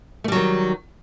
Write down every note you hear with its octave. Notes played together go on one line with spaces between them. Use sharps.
D#3 F#3 G3 A3